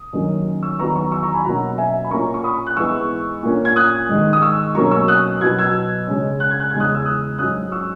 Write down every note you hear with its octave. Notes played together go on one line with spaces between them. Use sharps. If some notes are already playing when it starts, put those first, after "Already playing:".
Already playing: D#6
F#2 D#3 A#3 C#4
C#6 E6
E2 D#3 F#3 B3 A#5 C#6
A#5 C#6
C#6 E6
A#5 C#6
G#5 B5
B2 F#3 A#3 C#4 F#5 A#5
E5 G#5
B5
A#2 A#3 C#4 A#5 C#6
C#6
B5 D#6
F#6
G#2 E3 G#3 B3 C#6 E6
A#2 A#3 C#4
G#6
D#6 F#6
G#2 D#3 G#3
D#6
C#6 E6
B2 F#3 A#3 C#4 A#5 C#6
C#6 E6
D#6 F#6
B2 F#3 B3 G#6
E6 G#6
C#3 G#3 C#4
F#6
G#6
F#6
E2 C#3 G#3 G#6
D#6 F#6
E6
D#6 F#6
G#2 F#3 C#4 D#6 F#6
C#6 E6